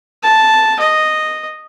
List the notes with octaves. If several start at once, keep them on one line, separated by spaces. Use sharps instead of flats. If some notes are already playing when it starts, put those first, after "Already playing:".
A5
D#5